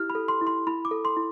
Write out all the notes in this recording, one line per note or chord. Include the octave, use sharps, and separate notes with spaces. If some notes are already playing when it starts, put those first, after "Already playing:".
Already playing: E4 G4 F6
B5
A4
C6
E4
C6
E4 B5
D6
A4
C6
E4